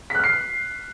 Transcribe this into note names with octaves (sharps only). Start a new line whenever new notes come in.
F6 F#6 B6 C7